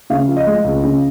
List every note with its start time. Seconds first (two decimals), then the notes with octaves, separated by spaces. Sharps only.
0.10 C#3 F5
0.28 F3
0.37 D#5
0.46 G#3
0.64 C#2
0.83 C#3